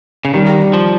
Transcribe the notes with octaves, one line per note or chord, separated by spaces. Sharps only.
C#3
D#3 G3
F3